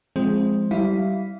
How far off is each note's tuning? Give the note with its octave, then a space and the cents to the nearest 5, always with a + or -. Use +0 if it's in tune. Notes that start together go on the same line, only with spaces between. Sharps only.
F3 +0 G#3 +0 C4 +10
G3 -25 E4 +0 F5 -5